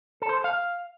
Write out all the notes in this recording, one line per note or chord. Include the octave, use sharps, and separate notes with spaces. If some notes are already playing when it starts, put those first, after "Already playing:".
A4
C5
A4
F5